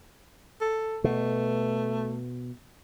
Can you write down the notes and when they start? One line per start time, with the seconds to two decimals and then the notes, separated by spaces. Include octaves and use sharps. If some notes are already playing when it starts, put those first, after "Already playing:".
0.61 A4
1.04 B2 A3